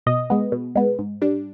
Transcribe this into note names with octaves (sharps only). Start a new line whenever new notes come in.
B2 D#5
G#3 B3
B2
G#3 B3
G#2
G3 D4